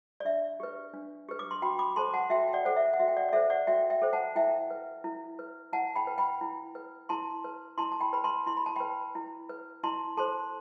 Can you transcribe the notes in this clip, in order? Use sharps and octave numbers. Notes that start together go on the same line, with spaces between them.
D5
D4 E5
G4 B4
D4
G4 B4
D6
C6
F#4 G5 B5
B5 D6
A4 C5 A5 C6
F#5 A5
F#4 E5 G5
G5
D5 F#5
A4 C5 F#5
E5
F#5
F#4 E5
G5
D5 F#5
D5
A4 C5 E5
D5 F#5
F#4 E5 G5
E5 G5
A4 C5
F#5 A5
E4 E5 G5
B4
E4
B4
E4 F#5 A5
G5 B5
B4
G5 B5
E4
B4
E4 A5 C6
B4
E4 A5 C6
A5
G5 B5
B4 B5
A5 C6
E4 C6
B5
A5
B4 G5 B5
E4
B4
E4 A5 C6
A4 C5 A5 C6